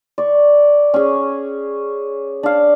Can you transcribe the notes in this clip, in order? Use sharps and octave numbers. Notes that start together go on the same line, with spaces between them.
D5 C#6
C#4 G#4
D4 F5